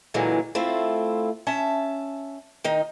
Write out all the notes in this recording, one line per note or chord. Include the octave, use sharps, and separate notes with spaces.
A#2 D3 E3 F#3 G#3
A3 C4 E4 F4
C#4 E5 A5
D#3 D#4